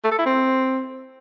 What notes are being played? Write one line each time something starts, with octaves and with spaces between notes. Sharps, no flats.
A3
A4
E4
C4